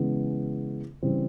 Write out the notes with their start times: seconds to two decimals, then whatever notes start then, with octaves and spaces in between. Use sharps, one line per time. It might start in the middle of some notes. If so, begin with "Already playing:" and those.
Already playing: C#3 E3 G#3 B3
1.02 C#3 E3 G3 C4